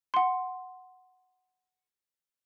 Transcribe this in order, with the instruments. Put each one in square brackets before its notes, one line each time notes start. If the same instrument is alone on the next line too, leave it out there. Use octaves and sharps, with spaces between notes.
[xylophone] F#5 C6